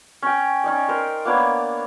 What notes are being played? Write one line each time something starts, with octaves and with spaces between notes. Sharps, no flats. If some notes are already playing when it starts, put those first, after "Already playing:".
C#4 G5
C#4 D#4 D5
A#4 C5
A#3 B3 D4 C#5